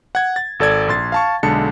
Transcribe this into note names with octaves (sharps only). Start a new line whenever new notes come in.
F#5 G#6
A6
G#1 A4 D5 G#6
A#1 C6 A6
F5 A5 C#6
B1 D3 G#3 A5 C#7